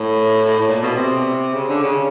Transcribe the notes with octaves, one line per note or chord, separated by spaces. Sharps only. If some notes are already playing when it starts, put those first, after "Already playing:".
Already playing: A2
A2
A#2
B2
C3
C#3
D3
C#3